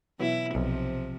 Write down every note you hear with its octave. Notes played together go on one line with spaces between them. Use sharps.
B2 E3 F#3 B3 E4
B1 C3 F3